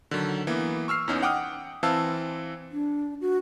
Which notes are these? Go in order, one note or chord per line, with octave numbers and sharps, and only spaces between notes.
D3 D#3 F#3
E3 A#3 B3
C#6 E6 F6 C7
E2 B3 C#4 D#4
F#5 G5 D6 D#6 F6
E3 C4 F5 A5 E6
D4
F#4